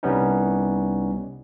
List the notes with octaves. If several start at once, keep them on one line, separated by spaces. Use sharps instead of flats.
C2 G3 B3 C#4 D#4